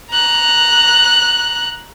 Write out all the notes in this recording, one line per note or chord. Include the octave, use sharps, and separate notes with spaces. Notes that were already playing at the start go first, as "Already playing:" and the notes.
A#5 F#6